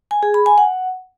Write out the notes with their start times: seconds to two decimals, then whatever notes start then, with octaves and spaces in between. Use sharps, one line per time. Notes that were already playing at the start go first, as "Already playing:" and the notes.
0.11 G#5
0.23 G#4
0.34 B5
0.46 G#5
0.58 F#5